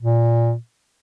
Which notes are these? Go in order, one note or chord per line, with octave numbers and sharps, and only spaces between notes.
A#2